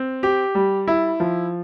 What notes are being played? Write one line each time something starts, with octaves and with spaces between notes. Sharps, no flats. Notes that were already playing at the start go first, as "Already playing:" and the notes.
Already playing: C4
G4
G3
E4
F3